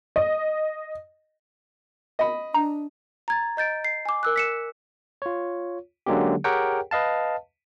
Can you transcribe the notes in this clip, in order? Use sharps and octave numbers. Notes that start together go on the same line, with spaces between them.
D#5
D#5 B5
D4 A#5
A#5 G#6 A6
D#5 G6 A6 D7
C7
G#5 D6
A#4 E6 F#6
B6 C#7 E7
F4 C#5
D3 F#3 G#3 A#3 C#4 G4
G4 G#4 A#4 C#5 F#5 G5
B4 D#5 F5 A5